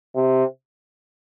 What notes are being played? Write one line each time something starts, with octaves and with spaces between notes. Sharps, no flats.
C3